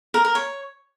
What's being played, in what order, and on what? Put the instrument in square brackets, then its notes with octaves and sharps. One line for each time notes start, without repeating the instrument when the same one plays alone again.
[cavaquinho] A#4
A#4
C#5